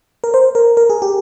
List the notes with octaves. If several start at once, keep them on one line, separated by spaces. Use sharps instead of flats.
A#4
C5
A#4
A#4
G#4
G4